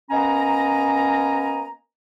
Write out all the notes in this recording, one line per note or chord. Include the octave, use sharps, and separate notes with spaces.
A#3 B3 C#4 D#5 G#5 A#5